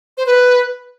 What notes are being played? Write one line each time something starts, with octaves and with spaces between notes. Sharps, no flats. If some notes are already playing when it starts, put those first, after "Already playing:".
C5
B4